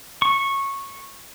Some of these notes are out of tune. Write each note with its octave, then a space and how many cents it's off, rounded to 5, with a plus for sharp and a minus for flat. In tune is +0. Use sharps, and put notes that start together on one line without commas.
C#6 -15